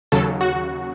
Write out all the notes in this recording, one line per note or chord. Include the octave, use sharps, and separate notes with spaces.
D#2 C#3 F#3 A4
F#4